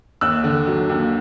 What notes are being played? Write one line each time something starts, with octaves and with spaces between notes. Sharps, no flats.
D#2 E6 F#6
D3
F#3
D#2